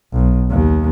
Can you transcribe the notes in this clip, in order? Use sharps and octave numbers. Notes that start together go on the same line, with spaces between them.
B1
D#2